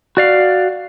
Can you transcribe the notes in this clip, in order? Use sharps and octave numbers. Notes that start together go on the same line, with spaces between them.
F#4 D5 F5